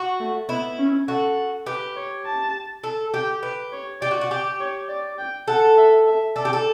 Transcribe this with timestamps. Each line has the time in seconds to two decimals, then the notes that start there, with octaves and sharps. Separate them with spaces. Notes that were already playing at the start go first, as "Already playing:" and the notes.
Already playing: F#4
0.20 A3
0.49 B3 E4
0.79 C#4
1.08 F#4 A4
1.66 G4 B4
1.97 C#5
2.26 A5
2.83 A4
3.14 G4 G5
3.43 G4 B4
3.73 C#5
4.02 G4 D5
4.11 F#4
4.21 F#4
4.31 G4
4.60 C#5
4.89 D5
5.18 G5
5.47 A4 F#5
5.78 E5
6.07 E5
6.36 A4 D5
6.45 G4
6.53 A4